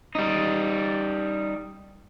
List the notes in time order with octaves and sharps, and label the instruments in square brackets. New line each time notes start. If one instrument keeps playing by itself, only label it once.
[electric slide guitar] G3 D#4